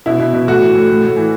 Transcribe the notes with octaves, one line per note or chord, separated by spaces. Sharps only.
B2 E4
B2
B2
A2 F#4
E3
A2
A2
A2
E3